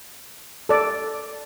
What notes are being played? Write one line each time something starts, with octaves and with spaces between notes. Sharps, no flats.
A4 D5